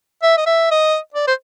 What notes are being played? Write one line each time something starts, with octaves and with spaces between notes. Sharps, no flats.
E5
D#5
E5
D#5
D5
C5